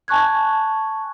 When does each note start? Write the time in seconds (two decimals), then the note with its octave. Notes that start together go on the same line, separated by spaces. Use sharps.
0.08 G#5 A5 C#6 F#6 G#6